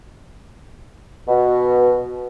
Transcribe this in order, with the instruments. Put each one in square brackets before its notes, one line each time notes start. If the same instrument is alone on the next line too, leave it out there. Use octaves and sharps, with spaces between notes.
[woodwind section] B2